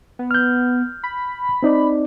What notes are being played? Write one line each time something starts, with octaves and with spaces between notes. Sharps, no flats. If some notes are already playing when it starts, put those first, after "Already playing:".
B3
F6 G6
B5
C4 D#4 D5